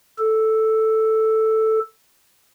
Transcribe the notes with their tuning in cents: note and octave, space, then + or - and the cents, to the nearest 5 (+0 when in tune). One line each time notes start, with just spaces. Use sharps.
A4 +0